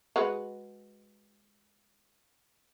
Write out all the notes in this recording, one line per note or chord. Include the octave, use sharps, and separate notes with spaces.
G#3 F#4 B4